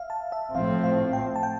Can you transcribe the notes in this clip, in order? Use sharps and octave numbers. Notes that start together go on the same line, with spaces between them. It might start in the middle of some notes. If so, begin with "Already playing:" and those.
Already playing: E5 F5
A5
E5
A2 F3 A3 C4 F5
F5
G5
A5
G5